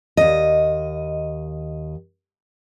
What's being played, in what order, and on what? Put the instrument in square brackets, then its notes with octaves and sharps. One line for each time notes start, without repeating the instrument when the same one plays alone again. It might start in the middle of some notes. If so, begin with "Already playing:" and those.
[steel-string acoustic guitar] D#2 D#5